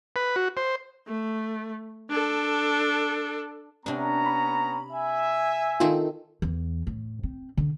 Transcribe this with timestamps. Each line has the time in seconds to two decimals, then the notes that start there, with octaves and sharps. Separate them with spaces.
0.16 B4
0.36 F#4
0.57 C5
1.07 A3
2.10 D4 A4
3.86 C3 B3 C#4 D4 A#5
4.26 B5
4.91 E5 G#5
5.80 D#3 A3 C4 D#4 F4
6.42 E2
6.87 A2
7.23 C4
7.57 D3